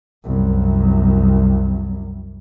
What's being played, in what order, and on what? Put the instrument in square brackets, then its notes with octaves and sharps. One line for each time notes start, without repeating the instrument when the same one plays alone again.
[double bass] C2 F#2